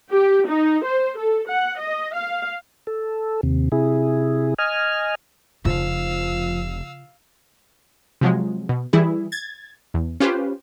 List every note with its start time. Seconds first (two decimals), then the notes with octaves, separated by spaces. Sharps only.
0.12 G4
0.47 D#4
0.85 C5
1.19 A4
1.48 F#5
1.79 D#5
2.15 F5
2.87 A4
3.43 D#2 C3
3.72 C3 E4 G#4
4.58 D#5 G#5 F6
5.65 F1 C#3 F3 F4 F5 E6
8.21 C3 F3 F#3 G#3
8.69 B2
8.93 E3 G3 E4 G#4
9.32 G#6 A6
9.94 E2
10.20 C#4 F4 G4 B4 C5